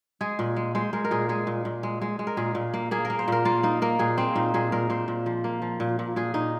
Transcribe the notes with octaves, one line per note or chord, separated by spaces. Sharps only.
G#3 G#4
A#2
G#3
G#3 C5
G#3 A#4
A#4
A#2 G#4
G#3 G#4
A#2
A#2
G#3
G#3
G#3
A#4
A#2 G#4
A#2
A#3
A#3 G#4
A#4
A#3
C5
A#2 A#4
A#3 F4
A#3 D#4
A#3 A#4
A#2 G#4
A#3 C4
A#2 D#4
A#2 G#4
A#2 A#4
A#2 C5
A#2
F3
A#3
F3
A#2
A#2
A#2 G#4
A#2 D#4